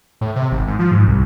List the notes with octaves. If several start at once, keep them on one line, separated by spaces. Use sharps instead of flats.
A2
C3
G#1
G#2
F3
G#2
C2